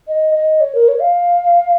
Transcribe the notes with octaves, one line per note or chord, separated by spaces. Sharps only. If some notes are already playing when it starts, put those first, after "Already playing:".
D#5
D#5
C#5
A#4
C#5
F5